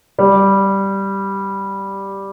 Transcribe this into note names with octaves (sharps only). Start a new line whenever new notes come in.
G3